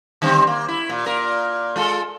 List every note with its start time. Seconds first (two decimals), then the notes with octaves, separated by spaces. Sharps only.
0.22 D3 G3 C4
0.47 A#3
0.68 E4
0.89 A#2
1.06 A#2 A#4
1.76 G#3 F4 A4